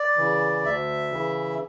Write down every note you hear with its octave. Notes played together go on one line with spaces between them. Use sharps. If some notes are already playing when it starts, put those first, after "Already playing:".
Already playing: D5
C#3 E3
D2 E5
C#3 E3